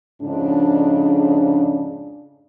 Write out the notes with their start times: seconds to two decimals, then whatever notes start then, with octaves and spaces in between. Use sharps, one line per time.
0.22 F2 G#2 C#3 D4